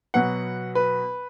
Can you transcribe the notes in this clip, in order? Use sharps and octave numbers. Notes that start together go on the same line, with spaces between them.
B2 F#3 B3 F#5
B4